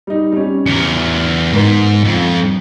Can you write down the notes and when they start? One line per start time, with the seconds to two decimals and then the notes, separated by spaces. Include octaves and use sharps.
0.07 G3 D#4
0.32 G3 C#4
0.66 E2 A#4 C#7
1.53 G#2 B3 A#4
2.04 F2